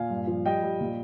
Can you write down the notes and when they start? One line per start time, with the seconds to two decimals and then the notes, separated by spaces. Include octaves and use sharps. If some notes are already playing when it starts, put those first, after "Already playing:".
Already playing: A#2 F5 G#5
0.10 G2
0.27 F3
0.46 G3 D#5 G5
0.63 G3
0.80 A#2